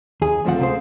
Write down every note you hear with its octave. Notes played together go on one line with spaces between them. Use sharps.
D#2 G#4
D2 F3 A3 C4 F4 F#5
C#2 C#3 C5